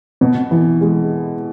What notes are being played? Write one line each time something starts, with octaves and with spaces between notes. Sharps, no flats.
B2
E3
G#3